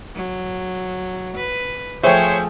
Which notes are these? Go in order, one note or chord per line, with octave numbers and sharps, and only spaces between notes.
F#3
B4
F3 A3 G#4 C5 C#5 E5 G5